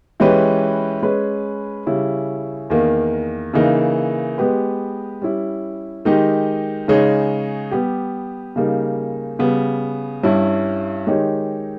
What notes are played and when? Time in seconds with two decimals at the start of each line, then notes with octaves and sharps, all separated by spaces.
0.20 E3 G#3 C#4 G4 B4
1.03 G#3 C#4 G#4 B4
1.86 C#3 G3 C#4 E4
2.70 E2 D#3 A#3
3.54 C#3 E3 A#3 D#4
4.38 G#3 B3 G4 B4
5.22 G3 C#4 E4
6.05 D#3 G#3 D#4 G4
6.88 C#3 G#3 D#4 G#4 C#5
7.71 G3 B3 G4
8.56 C#3 G3 A#3 D#4
9.39 C#3 G3 B3
10.23 G2 G3 C#4 E4
11.07 D#3 G#3 D#4 G4 C#5